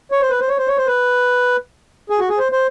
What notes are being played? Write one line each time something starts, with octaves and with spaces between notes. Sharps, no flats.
C#5
C5
B4
C5
C#5
C5
C#5
C5
B4
G#4
F#4
G#4
C5
C5